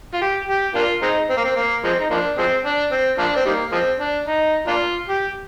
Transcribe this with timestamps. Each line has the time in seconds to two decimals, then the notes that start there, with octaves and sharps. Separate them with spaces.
0.14 F4
0.21 G4
0.48 G4
0.75 A#3 D4 F4
1.02 G#3 C4 D#4
1.29 C4
1.37 A#3
1.44 C4
1.56 A#3
1.84 F3 G#3 C4
1.99 D#4
2.10 F3 A#3 D4
2.38 F3 G#3 C4
2.65 D4
2.92 C4
3.18 F3 A#3 D4
3.36 C4
3.46 D#3 G3 A#3
3.72 F3 G#3 C4
3.99 D4
4.26 D#4
4.67 A#3 D4 F4
5.08 G4